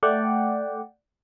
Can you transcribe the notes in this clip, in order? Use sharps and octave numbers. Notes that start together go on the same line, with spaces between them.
A3 D5 F#5 G5